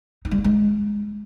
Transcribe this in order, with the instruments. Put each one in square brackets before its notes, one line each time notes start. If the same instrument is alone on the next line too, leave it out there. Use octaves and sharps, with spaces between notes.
[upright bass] D#4
G3
D#4
G#3